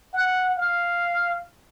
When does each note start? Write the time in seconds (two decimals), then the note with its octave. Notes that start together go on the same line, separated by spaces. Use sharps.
0.14 F#5
0.57 F5